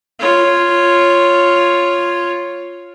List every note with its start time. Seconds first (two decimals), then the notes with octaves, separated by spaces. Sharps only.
0.19 F4 C#5